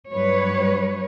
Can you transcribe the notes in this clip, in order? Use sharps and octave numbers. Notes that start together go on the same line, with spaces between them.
G2 F#3 G3 B4 C#5